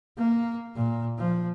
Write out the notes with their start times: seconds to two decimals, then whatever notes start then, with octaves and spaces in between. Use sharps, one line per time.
0.17 A#3
0.75 A#2
1.18 F3